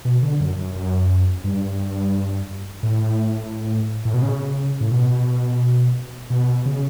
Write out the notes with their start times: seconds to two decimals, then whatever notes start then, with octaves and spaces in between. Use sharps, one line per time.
0.05 B2
0.22 D3
0.40 F#2
0.58 F#2
0.75 F#2
1.44 G2
2.83 A2
4.05 A2
4.14 B2
4.22 C#3
4.80 A2
4.91 B2
6.30 B2
6.66 C#3